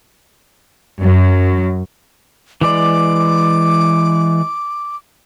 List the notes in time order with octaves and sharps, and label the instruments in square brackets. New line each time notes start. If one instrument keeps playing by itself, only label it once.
[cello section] F#2
[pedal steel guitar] E3 G#3 D5 [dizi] D6